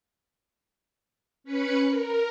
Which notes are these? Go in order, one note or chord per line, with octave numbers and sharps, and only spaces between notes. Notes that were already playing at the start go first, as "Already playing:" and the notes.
C#4 B4 B5 C#7
A#4